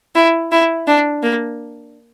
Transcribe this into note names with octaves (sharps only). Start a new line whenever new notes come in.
E4
E4
D4
A#3